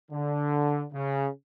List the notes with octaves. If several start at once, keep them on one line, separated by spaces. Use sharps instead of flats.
D3
C#3